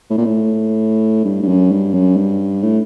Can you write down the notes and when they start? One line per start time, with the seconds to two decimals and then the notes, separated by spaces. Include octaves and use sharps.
0.10 A2
0.18 A#2
0.25 A2
1.25 G2
1.42 G2
1.48 F#2
1.72 G2
1.94 F#2
2.17 G2
2.63 A2